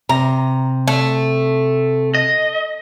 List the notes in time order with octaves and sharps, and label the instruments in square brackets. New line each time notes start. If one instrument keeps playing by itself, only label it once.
[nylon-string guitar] C3 [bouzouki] A#5
[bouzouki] A3
[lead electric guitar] D#5